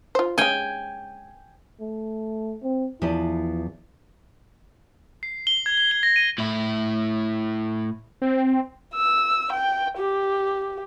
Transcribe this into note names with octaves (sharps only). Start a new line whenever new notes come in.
F4 C5
G#3 C#4 G5 G#5
A3
C4
E2 F3 E4 B4
C7
G7
G#6
G#6
G7
A#6
D#7
A2 E4
C4
E6
G5
G4